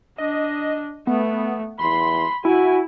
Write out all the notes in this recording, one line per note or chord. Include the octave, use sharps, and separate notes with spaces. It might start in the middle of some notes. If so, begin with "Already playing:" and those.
D4 D#5
A3 B3
E2 B5 C6
E4 F#4 G#5